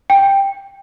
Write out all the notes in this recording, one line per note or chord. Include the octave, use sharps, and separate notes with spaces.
G5